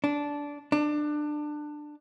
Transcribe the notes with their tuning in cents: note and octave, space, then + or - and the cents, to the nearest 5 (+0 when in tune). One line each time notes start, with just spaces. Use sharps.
D4 -15
D4 +20